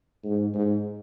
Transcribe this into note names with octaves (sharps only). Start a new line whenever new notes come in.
G#2
G#2